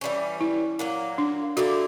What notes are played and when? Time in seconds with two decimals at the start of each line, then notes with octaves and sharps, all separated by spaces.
0.01 E3 G3 C#4
0.41 E4
0.79 A#2 F#3 A#3
1.18 D4
1.57 D3 A#3 E4 F#4 G4